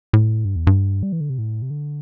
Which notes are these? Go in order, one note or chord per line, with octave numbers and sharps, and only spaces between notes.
A2
G2
E2
G2
G3
E3
D3
C3
A2
C3
D3